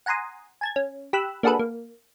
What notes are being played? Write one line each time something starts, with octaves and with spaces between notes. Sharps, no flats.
F#5 G#5 A#5 C6 D#6
G#5 A5 G#6
C#4
G4 B5 E6 F#6
A#3 D4 F#4 G#4 A4 B4
A#3